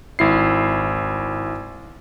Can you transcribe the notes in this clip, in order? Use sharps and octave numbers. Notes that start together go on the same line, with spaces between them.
G#1 E4 C7